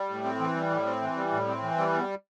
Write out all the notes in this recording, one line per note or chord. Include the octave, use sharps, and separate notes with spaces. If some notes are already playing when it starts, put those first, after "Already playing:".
Already playing: G3
A2
C4
E3
G3
A2
C4
E3
G3
A2
C4
E3
G3
E2